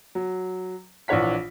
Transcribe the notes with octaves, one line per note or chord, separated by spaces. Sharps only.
F#3
A#1 E3 D4 C#5 F#5 B6